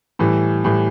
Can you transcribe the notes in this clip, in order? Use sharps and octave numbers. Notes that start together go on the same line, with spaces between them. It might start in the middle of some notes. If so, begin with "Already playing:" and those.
A2 E3 G3
A2 E3 G3